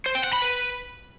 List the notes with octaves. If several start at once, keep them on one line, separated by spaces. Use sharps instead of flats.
C5
G5
F#5
B5
B4